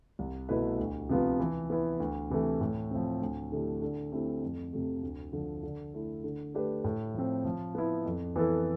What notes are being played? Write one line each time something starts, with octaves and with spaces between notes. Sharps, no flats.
C2
B2 A3 E4 B4
D2
C3 F3 B3 F4
E3
B3 E4
D2
C3 E3 A3 E4
A2
F3 C4
D2
D3 A3 E4 G4
D3
A3 C4 E4 G4
F2
C3 F3 A3
D2
D3 F3
D3
A3 E4
D3
A3 D4 G4 B4
A2
F3 C4
F3
B3 E4
F2
E3 B3 E4 A4